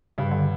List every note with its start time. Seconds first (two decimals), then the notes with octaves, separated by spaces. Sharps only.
0.18 G2 C#3
0.31 D3